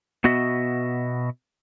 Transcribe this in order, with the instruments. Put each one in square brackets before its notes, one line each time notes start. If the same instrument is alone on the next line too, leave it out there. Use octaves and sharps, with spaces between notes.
[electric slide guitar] B2 B3 F#4 D#5 E5